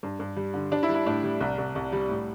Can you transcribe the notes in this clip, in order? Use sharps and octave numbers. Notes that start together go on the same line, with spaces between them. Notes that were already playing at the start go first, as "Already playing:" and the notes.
G2
G2
G3
D3
G3 D4
E4
G3
E4
A2 D4
G3
C2
C2
C2
G3
A2